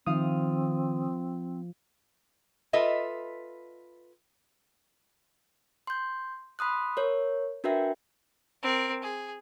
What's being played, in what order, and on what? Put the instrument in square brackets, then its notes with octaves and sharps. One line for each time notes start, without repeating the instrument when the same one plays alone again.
[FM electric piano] D#3 D#6 [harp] F3 F5 [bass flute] C4
[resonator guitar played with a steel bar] F4 A4 B4 D#5 E5
[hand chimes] C6 G6
B5 C6 D#6 F#6
A#4 C#5
D4 F#4 A#4 B4 E5 G5
[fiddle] C4 A#4
G#4